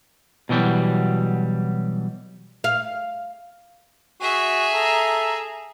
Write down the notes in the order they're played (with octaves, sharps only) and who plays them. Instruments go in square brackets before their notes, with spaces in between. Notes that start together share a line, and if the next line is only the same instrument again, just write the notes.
[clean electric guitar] B2 E3 F#3 G3
[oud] F5
[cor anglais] F#4 [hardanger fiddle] G#4 E5
[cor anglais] A4 [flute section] A#5